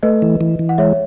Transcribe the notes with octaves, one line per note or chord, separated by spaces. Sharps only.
A3 B4 D#5
E3
E3
E3
F#5
G#3 C#5 E5